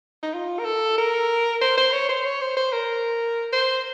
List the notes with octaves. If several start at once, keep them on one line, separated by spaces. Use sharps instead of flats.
D#4
F4
A#4
A4
A#4
C5
C5
C#5
C5
C#5
C5
C5
A#4
C5